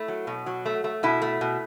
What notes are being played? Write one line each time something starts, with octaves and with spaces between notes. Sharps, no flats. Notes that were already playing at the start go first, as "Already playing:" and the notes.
Already playing: A3 E4
F#3
B2
F#3
A3
A3
B2 E4
A3
B2